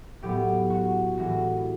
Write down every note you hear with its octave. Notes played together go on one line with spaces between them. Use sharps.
A2 F#3 B3 G4
F#4
A2 E3 G#3 F#4